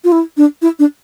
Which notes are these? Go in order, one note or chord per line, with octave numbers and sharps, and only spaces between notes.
F4
E4
D4
E4
D4